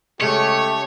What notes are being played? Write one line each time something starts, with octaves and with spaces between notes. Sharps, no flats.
C#3 G#3 A3 G4 C#5